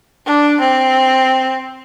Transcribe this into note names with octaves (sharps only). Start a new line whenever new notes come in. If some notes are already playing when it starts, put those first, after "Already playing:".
D4
C4